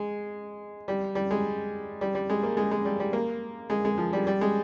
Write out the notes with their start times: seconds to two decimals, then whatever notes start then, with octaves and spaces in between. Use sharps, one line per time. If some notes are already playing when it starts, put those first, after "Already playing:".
Already playing: G#3
0.88 G3
1.15 G3
1.31 G#3
2.01 G3
2.15 G3
2.29 G#3
2.43 A#3
2.57 G#3
2.71 G#3
2.85 G3
3.00 G3
3.13 A#3
3.70 G#3
3.85 G#3
3.98 F3
4.13 G3
4.27 G3
4.41 G#3